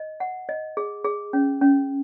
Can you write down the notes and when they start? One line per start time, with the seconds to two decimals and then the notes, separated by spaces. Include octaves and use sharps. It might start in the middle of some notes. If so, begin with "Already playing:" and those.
Already playing: D#5
0.20 F#5
0.49 D#5
0.77 G#4
1.05 G#4
1.33 C#4
1.62 C#4